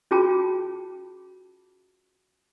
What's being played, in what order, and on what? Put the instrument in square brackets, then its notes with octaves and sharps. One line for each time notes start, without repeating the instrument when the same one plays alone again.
[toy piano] C#4 F4 F#4 G#4 G5 A5